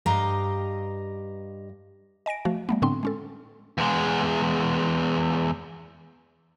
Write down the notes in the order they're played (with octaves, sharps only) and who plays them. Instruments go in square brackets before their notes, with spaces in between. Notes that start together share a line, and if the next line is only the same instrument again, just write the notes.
[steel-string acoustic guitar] G2 G4 D#5 F5 A#5
[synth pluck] D#5 G#5 A#6 D7
F3 A3 F#4 F5
G3 A3 B3
A2 D3 B3 C4 D4 C6
G#3 C#4 A4
[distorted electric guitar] E2 G#3